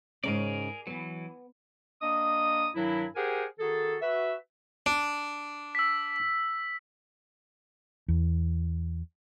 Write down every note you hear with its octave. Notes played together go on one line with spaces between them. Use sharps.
G#2 C#3 C#4 G#4 A#4 D5
E3 F#3 B3
A#3 D4 D#5 D#6
G2 D#3 F#3 E4
G4 G#4 A#4 C5 F#5 G#5
D#3 F#4 G#4 A4
F#4 B4 E5
D4
E6 B6
E2